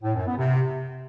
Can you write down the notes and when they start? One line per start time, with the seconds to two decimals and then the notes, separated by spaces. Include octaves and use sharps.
0.03 A2
0.14 F#2
0.26 B3
0.37 C3